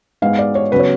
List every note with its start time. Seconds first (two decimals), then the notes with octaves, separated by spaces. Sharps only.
0.22 G#2 G#3 B3 F5
0.39 D5
0.55 C#5
0.72 C#3 F#3 B3 B4
0.79 C#5